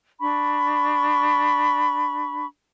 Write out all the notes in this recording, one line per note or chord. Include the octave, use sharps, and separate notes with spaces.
D4 B5 C#6